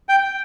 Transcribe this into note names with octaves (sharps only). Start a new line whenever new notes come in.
G5